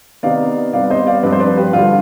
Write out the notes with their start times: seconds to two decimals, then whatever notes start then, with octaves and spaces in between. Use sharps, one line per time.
0.23 C3 D#3 B3 D5 F5
0.73 C3 G3 B3 D5 F5
0.90 C5 D#5
1.07 D5 F5
1.23 G2 F3 C4 B4 D5
1.32 C5
1.40 B4 D5
1.57 G4 B4
1.73 G2 D3 G3 F4